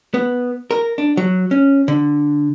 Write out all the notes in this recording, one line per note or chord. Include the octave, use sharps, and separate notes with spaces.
B3
A#4
D4
F#3
C#4
D3